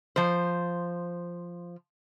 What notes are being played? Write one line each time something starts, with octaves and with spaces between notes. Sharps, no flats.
F3 C5